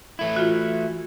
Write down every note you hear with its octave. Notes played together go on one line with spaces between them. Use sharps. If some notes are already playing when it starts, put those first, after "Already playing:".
E3 A3 E4
F4 F#4